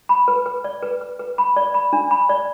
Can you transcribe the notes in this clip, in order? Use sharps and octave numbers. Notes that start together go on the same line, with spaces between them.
B5
B4
B4
D5
B4
B4
B4
B5
D5
B5
D4
B5
D5